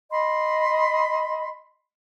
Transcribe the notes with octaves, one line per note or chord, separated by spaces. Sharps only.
D#5 B5 C6